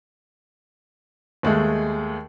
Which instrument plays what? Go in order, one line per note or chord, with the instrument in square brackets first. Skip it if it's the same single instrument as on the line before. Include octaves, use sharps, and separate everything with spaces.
[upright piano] D#2 G#3 A3 G#4